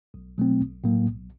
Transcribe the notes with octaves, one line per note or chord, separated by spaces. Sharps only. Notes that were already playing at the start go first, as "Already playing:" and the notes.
B1
B2 F#3 A3 C4
B1
A2 F#3 A#3
B1